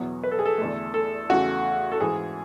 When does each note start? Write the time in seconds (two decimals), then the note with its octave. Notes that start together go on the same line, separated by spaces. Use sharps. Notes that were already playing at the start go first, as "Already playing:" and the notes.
Already playing: E2 B2 F#3 B3 F#4
0.24 B4
0.31 A4
0.39 G#4
0.46 A4
0.58 E2 D3 A3
0.94 A4
1.29 E2 C#3 E3 A3 F#4
1.92 A4
2.00 G#2 E3 G#3 G#4